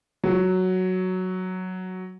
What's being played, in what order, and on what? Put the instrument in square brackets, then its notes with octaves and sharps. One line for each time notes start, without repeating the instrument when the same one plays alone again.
[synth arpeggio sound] C#2 [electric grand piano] F#3